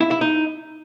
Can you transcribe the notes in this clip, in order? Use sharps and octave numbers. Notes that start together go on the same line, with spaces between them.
E4
E4
D#4